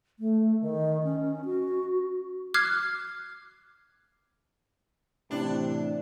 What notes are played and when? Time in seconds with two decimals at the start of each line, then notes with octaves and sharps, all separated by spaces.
0.19 A3
0.61 D#3
1.03 C#4
1.45 F#4
2.54 D6 F6 F#6 G#6 C7
5.31 A2 C3 E3 D4